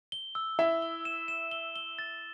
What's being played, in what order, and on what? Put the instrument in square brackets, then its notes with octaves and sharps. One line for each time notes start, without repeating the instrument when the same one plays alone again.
[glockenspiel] G7
E6
[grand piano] E4 E5 [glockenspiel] E6
[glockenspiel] G7
E7
E7
G7
G7
A6